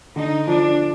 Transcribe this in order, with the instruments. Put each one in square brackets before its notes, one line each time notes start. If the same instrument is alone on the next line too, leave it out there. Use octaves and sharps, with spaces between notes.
[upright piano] D3 [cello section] D#4
[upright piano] F3 [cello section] D4